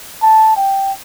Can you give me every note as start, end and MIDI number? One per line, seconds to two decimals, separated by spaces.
0.22 0.56 81
0.56 0.92 79